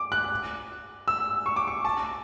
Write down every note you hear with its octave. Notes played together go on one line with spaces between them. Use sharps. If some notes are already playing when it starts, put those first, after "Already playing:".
Already playing: D6
F#6
E6
C#6
D6
C#6
A5